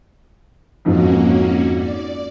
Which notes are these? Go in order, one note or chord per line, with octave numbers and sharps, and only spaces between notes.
F2 G#2 F3 A#3 C#4 F#4
D5